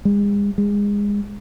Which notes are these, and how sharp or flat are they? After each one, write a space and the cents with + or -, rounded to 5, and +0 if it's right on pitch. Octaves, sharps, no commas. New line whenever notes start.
G#3 -40
G#3 -25